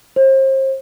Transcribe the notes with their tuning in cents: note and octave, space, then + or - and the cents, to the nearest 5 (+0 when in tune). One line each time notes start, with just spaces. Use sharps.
C5 +35